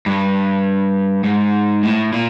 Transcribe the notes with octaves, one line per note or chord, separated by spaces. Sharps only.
G2
G#2
A2
A#2